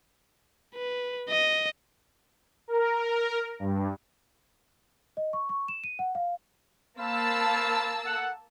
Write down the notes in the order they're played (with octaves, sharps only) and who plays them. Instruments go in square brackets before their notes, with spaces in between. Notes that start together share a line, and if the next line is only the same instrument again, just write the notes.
[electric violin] B4
D#5
[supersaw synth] A#4
G2
[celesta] D#5
C#6
C#6
E7
D#7
F#5
F5
[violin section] A#3 A5 E6 [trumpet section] C5 F5 B5
[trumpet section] A4 F#5